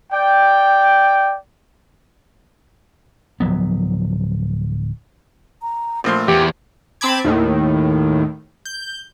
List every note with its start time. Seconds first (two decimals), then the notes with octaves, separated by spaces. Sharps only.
0.12 D5 G5
3.40 D1 F3 F#3 B3
5.62 A#5
6.04 A#1 F3 A3 C6
6.28 E2 G4
7.01 C4 A5 B5 D6 G#6
7.25 D#2 A2 D#3
8.65 G6